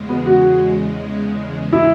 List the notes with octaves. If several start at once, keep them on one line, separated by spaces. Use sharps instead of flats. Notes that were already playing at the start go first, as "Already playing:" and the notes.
Already playing: E2 C#3 G#3
B3
F#4
E4